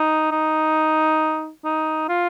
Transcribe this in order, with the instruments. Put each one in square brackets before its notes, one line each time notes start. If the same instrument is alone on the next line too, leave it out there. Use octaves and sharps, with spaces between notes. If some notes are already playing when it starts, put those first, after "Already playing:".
Already playing: [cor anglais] D#4
D#4
D#4
F4